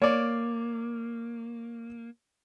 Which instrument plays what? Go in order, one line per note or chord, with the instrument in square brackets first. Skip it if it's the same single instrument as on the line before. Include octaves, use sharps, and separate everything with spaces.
[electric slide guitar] A#3 [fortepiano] C#5 D5